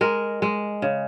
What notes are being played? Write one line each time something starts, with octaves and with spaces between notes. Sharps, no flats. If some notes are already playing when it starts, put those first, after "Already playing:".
G#3 A#4
G#3
C#3